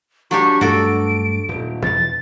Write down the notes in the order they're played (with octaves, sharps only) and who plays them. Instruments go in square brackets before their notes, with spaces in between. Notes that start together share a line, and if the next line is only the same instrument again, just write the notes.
[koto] F#3 D4 G4 [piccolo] C#6
[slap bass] G2 A3 [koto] F#4 A4 [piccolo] D7
[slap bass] D#1
[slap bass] E2 B2 [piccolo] A6